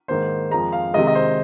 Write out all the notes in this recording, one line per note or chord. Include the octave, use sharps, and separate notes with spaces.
G#2 D#3 A#3 C5
F2 F3 G#3 A#5
F5
C3 D#3 G#3 D#5
D#5
C5